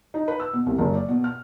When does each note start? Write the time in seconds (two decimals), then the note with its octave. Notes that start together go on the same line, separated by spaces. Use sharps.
0.14 D#4
0.28 B4
0.40 E6
0.53 B2
0.66 C2
0.79 F#1
0.94 D5
1.09 B2
1.24 F6